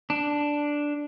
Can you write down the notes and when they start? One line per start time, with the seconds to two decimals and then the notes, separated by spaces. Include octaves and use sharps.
0.10 D4